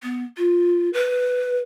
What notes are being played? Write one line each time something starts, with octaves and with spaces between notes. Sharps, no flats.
B3
F4
B4